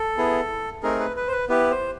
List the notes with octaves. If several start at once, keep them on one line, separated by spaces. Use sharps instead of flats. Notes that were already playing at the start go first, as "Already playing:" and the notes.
Already playing: A4
B3 E4 G#4
A3 C4 D#4 G#4 A#4
B4
B4
C5
B4
B3 E4 G4 B4
C5